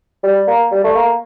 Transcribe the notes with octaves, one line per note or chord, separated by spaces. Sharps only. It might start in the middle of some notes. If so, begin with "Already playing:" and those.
G3
A#3
G3
A3
A#3